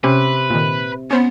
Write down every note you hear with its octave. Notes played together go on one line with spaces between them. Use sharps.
C3 C#4 B4
A#2 D#3
B3 C#4 C5 B5